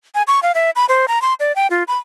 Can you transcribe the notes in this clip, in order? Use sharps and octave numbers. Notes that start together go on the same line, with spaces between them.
G#5
C#6
F5
E5
B5
C5
A#5
C6
D5
G5
F4
B5